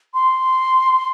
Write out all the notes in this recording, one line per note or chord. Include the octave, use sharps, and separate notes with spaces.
C6